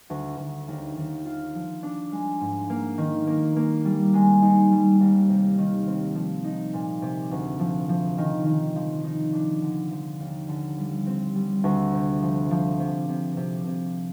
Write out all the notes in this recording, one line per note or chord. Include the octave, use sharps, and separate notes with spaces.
D2
D2
D#2
D#2
F4
F3
D4
G#3
G#2
A#3
D#3
A#3
A#3
G3
G#3
D#4
G3
D#2
C3
D#3
C4
F3
D#4
A#2
C3
D2
F3
F3
D#3
D#3
F3
D#4
D4
D3
F3
D#2
D3
G3
C4
G3
D2
C3
F3
F3
C3
C3
C3
C3